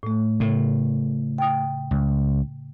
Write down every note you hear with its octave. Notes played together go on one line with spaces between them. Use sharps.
A2 A3
A2 C#3
G5 D#6
C#2